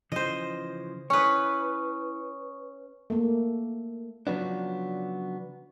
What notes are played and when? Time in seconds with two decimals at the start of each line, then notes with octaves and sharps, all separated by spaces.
0.12 C#3 E3 F3 C5 D#5
1.10 C#4 E4 B4 C#5 C#6 D#6
3.10 A3 A#3
4.27 C#3 F3 F#3 B3 D4